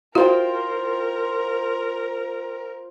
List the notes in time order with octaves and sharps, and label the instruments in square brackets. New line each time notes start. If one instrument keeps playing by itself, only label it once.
[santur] F4 C5 G5 [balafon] F#4 [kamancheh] A#4